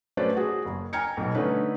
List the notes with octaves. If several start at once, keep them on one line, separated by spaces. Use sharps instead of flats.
F#3 A3 C#4 B4 C5 D5
F#4 G#4
F#1
G5 G#5 A#5 F6 G#6 C#7
B1 B2
D3 A3 C#4 D#4 B4